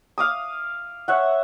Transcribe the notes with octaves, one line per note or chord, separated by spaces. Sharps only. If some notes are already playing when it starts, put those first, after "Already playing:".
F5 D6 D#6
C#5 E5 F#5